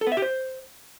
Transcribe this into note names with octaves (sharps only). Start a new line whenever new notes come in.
A4
B3
E5
G4
C5